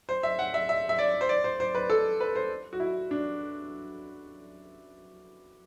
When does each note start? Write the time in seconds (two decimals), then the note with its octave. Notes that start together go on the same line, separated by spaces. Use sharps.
0.09 C5
0.23 E5
0.39 F#5
0.54 E5
0.69 E5
0.89 E5
0.99 D5
1.21 C5
1.29 D5
1.44 C5
1.60 C5
1.75 B4
1.90 A4
2.20 B4
2.35 C5
2.73 F#4
2.80 E4
3.11 D4